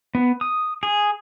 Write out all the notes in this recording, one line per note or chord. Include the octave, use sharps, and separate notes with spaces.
B3
D#6
G#4